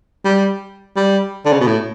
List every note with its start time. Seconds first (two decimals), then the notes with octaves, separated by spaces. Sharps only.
0.25 G3
0.96 G3
1.45 D3
1.53 C#3
1.60 B2
1.67 A2